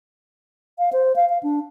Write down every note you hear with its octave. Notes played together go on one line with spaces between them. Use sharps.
F5
C5
F5
F5
D4